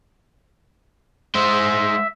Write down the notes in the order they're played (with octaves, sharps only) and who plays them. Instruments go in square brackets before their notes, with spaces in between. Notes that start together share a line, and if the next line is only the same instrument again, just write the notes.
[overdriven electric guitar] G#3 C5 [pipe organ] E5